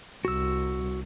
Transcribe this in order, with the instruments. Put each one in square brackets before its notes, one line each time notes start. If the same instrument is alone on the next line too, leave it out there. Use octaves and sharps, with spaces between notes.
[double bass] C2 [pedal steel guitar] F#4 E6